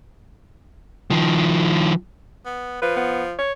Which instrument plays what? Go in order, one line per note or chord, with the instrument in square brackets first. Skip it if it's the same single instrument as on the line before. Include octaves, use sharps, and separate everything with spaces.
[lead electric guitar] D#3 F3
[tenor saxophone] B3
[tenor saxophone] F3 [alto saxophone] B4
[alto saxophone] B3
C#5